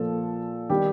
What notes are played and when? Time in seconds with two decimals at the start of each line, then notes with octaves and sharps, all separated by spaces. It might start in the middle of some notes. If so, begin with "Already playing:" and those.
Already playing: A#2 F3 A4
0.70 D#3 G3 G4